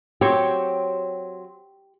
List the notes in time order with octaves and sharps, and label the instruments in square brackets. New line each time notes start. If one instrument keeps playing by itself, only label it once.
[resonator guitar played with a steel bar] F#3 C4 C#5 [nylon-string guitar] G4